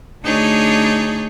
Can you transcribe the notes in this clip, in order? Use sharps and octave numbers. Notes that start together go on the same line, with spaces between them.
D2 D4 D#4 G#4 C#5